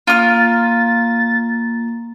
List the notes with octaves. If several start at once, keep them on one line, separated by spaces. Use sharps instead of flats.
A#3 F4 F6 A6